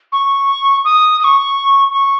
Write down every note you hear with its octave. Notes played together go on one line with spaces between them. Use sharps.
C#6
D#6
D#6
C#6
C#6